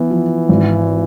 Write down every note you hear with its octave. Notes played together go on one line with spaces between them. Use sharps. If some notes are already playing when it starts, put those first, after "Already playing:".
Already playing: E3 B3
F3
G#1